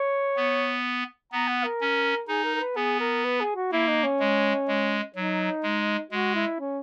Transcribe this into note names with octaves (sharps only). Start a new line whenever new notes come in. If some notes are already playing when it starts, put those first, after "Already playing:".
Already playing: C#5
B3
B3 A#5
F#5
A#4
C#4
D#4 G#4
A#4
A#4
B4
B3 G#4
A#4
B4
G#4
F#4
A#3 E4
D#4
C#4
G#3
G#3
F#3 D#4
G#3
G#3 F#4
E4
C#4